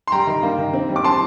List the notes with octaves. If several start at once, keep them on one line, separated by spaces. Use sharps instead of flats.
C6
G3 G5 A#5
D#3
A#3
D#3
C4
G3
D6
C4 A5 C6